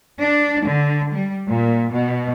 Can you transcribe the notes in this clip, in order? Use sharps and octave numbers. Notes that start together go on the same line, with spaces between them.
D4
D3
G3
A#2
B2